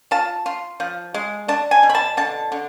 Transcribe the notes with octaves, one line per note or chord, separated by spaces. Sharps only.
F4 A5
F4
F3
G#3
D4 A5
G#5
B2
B5
A5
D3 A5
D3